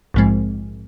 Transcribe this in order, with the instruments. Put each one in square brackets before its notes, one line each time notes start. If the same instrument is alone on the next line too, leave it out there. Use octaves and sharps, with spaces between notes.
[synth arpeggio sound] A#1 G#2 F3 G#3 C4